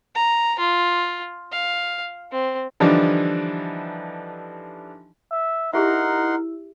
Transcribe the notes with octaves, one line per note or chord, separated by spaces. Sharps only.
A#5
F4
F5
C4
D3 E3 F3 G3 D4 D#4
E5
D#4 E4 G4 G#4 A#4 E5 F#5 C6